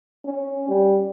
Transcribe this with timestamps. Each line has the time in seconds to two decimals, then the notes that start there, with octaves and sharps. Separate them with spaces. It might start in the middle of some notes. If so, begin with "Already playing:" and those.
0.25 C#4
0.68 G3